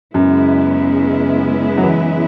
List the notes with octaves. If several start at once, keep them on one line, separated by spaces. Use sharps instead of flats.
F#2 C#3 G#3 B3 E4
F#3
E3